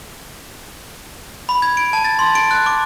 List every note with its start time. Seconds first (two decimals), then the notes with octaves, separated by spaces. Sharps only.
1.49 B5
1.62 G#6
1.77 D7
1.93 A5
2.05 A6
2.19 C6
2.35 D7
2.51 F#6
2.66 D6